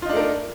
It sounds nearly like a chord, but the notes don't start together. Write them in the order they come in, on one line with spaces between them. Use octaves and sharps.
F4 D#4 D4 A3 A#4